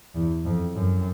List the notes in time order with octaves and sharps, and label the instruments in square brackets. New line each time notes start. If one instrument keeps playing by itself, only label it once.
[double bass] E2
F2
F#2